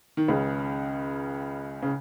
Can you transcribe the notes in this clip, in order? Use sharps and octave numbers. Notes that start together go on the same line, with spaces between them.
D#3
C#2 C#3
C#3